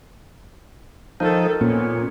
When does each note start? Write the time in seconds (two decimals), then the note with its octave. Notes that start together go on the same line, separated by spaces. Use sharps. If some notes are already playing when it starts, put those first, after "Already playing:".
1.20 D#3 F3 D#4 A4
1.61 A#2 B3 C#4